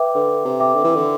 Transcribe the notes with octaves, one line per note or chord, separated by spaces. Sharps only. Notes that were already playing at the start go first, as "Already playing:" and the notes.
Already playing: B4 E5 G5 D6
D3 B4
C3
E5 G5 D6
D3
E3
D3